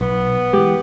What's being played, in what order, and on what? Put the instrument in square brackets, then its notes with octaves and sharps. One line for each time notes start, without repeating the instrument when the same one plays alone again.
[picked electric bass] B1 [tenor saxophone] B3
[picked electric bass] E3 G#3 [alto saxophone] G4